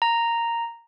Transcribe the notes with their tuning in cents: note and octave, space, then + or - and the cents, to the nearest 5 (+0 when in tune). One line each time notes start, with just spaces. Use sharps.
A#5 -5